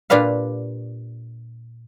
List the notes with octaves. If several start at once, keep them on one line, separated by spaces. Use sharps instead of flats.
A#2 D4 G4 B4 F5